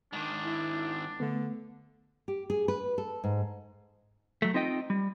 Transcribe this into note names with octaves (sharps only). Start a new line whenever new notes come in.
G#2 D#3 D4
E4
D3 A3 B3
G4
G#4
B4
A4
G#2
F#3 A3
C4 D#4 F4 D#5 G5
G3